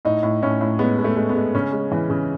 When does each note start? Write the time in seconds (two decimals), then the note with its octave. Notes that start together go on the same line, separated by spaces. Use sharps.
0.05 A2 D#4
0.23 A2
0.43 A2 C#4
0.61 A2
0.79 G#3 B3
0.98 G#3
1.04 A3
1.16 G#3
1.29 B3
1.35 G#3
1.55 C#3 C#4
1.72 G#3
1.92 E3
2.10 C#3